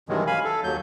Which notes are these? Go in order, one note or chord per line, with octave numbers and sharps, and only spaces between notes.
G2 C3 D#3 E3 F#3 G#3
F5 G#5 B5
A4
D#2 F#3 G6